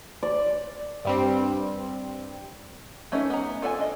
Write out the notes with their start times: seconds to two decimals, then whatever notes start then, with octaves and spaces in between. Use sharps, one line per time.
0.23 D5
1.05 G2 G3 C4
3.12 A3 C#4 D#4 G#4 A#4
3.30 B3 A#5
3.62 F4 A4 D5 F5 G#5
3.79 D4 D#5